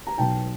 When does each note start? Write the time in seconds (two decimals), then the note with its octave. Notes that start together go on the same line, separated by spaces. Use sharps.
0.07 A#5
0.18 B1 B2 F#3 G5 A5